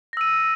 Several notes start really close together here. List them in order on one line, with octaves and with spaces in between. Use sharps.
A#6 E6 D#7